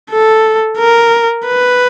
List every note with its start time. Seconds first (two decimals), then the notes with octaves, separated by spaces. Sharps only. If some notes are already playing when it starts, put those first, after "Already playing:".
0.10 A4
0.78 A#4
1.47 B4